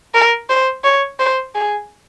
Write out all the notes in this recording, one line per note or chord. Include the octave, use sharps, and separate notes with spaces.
A#4
C5
C#5
C5
G#4